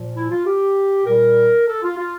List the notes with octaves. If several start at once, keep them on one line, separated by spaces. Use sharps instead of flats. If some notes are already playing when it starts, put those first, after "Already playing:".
Already playing: A#2 F3
E4
F4
G4
A#2 G3 A#4
A4
F4
F4